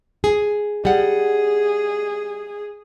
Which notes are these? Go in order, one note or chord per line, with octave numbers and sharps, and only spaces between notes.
G#4
G3 G#4 F#5